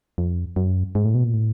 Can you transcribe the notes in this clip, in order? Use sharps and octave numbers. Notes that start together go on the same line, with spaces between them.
F2
F#2
G#2
A2
B2
A#2
A2